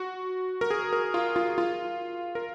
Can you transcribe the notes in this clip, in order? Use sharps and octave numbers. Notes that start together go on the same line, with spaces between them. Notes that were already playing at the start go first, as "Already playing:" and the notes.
Already playing: F#4
A#4
G#4
A#4
F4
F4
F4
A#4